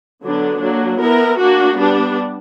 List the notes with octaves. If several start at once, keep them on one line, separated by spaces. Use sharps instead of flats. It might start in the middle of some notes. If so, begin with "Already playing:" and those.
D3 F#3 B3 D4
F#3 A#3 D4
B3 E4 A#4
A#3 D4 F#4
G3 B3 D4